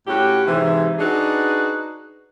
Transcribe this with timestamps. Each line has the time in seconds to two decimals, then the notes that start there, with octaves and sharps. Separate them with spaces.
0.07 A2 C#4 F#4 G4
0.46 G#2 C3 E3
0.98 D4 D#4 F#4 G#4 B4